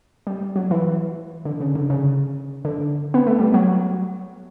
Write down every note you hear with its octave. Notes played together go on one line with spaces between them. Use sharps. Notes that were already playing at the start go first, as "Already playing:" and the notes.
G3
F#3
E3
D3
C#3
D3
C#3
D3
B3
A3
G3
F#3